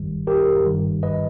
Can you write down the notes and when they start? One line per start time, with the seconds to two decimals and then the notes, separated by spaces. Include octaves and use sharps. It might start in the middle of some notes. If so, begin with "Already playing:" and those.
Already playing: G1 G2 D#3 G3
0.27 G4 A#4
0.65 G1 G2 D#3 G3
1.03 B4 D#5